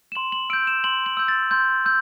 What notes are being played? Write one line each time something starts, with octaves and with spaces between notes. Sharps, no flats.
E7
C6 F#7
F#7
E6 G6 D7
E7
C6 F#7
F#7
E6 G6
A6
C6 G6
E6 G6